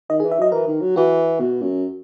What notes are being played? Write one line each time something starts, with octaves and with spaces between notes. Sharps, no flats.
D#3 D#5
G#4
E3
E5
F#3 D#5
E3 A#4
D#3
F#3
E3 F#4
B2
F#2